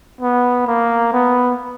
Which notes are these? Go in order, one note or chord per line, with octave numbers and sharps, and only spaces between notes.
B3
A#3
B3